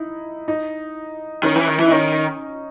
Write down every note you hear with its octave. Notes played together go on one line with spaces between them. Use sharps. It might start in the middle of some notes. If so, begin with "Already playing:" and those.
Already playing: D#4 E4
D#4
D#3 C#4
E3
D#3
E3
D#4
D#3 C#4